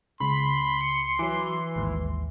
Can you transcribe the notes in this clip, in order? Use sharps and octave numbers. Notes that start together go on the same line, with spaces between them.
C#2 C#3 B5 C6
C#7
E3 F#3 D6
A1 D#2 G#2